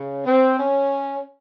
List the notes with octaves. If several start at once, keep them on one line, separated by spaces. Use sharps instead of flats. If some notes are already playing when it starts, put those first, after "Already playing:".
Already playing: C#3
C4
C#4